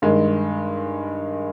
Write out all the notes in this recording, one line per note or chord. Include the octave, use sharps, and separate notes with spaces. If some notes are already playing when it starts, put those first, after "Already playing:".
G2 D#3 G#3